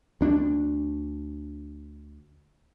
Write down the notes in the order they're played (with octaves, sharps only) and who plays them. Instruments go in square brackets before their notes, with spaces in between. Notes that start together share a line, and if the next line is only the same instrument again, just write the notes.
[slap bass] D2 D4